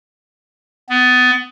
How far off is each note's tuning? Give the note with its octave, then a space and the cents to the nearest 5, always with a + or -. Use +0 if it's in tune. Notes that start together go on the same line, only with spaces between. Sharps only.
B3 +25